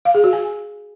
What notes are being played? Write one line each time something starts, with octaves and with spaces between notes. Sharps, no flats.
F5
G#4
F#4
G#5